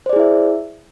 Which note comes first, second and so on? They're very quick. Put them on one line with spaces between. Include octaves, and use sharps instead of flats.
C5 D5 G#4 E4 E5